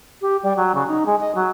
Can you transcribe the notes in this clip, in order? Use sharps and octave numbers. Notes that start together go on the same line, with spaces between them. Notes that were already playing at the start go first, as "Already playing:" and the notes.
G4
G3
F#3
C#3
D#4
G#3
D#5
F#3